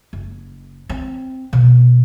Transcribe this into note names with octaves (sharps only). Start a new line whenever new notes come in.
F#1
C4
B2